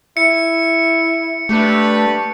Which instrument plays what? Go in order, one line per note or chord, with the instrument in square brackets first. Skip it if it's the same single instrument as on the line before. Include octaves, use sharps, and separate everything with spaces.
[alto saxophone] E4 [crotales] C#7
[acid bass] A3 [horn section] D4 G4 B4